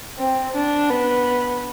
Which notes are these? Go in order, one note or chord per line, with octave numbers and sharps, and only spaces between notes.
C4
D4
B3